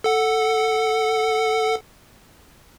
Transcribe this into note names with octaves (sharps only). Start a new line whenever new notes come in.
A4 F#5